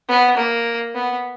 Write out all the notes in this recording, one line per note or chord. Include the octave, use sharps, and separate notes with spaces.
B3
A#3
B3